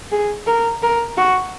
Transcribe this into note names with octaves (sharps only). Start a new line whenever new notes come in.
G#4
A#4
A#4
F#4